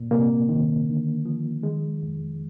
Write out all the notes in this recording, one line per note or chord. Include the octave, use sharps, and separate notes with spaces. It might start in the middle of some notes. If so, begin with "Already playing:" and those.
Already playing: A#2
C3 A#3
D#3
D3
F3
D#3 G#3
F2